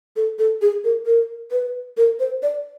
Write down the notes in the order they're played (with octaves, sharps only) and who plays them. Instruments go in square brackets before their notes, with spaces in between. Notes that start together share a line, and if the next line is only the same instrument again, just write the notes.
[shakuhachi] A4
A4
G#4
A#4
A#4
B4
A#4
C5
D5